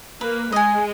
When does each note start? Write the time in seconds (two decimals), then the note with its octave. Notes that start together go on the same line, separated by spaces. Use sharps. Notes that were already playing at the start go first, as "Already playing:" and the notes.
0.21 A#3 B4
0.52 G#3 D#5 G#5